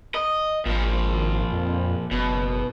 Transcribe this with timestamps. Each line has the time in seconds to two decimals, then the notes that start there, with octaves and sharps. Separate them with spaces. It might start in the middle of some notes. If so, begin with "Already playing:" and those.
0.15 D#5
0.66 G#1 A#2 F3
1.52 F2
2.11 F#1 B2